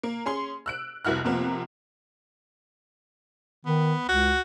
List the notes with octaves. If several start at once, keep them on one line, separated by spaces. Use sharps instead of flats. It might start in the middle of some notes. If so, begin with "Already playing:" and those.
A#3
C#4 G#4 C6
E6 F#6 D7
F1 C2 E4 F#4 F6 F#6
F2 C3 F3 A#3 B3
D#3 B3
C#2 F#4